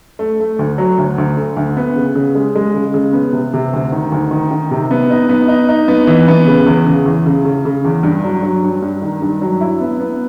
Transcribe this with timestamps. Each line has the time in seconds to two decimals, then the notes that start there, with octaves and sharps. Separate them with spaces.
0.19 A3
0.40 A3
0.59 D2
0.78 F#3
0.98 D2
1.18 D2
1.37 D3
1.57 D2
1.77 B3
1.96 C#3
2.15 C#3
2.35 G#3
2.56 G#3
2.74 C#3
2.94 C#3
3.13 B3
3.33 C3
3.54 C3
3.73 D2
3.92 D#3
4.12 D2
4.31 D#3
4.51 D#3
4.71 C3
4.91 B3
5.10 D#4
5.29 B3
5.48 D#4
5.69 D#4
5.88 B3
6.07 E3
6.28 B3
6.47 C#3
6.66 E2
6.86 C#3
7.06 E2
7.26 C#3
7.45 C#3
7.65 C#3
7.85 E2
8.03 G2
8.24 F#3
8.43 F#3
8.63 G2
8.82 G2
9.02 D#3
9.22 G2
9.42 F#3
9.61 E4
9.80 B3
10.00 B3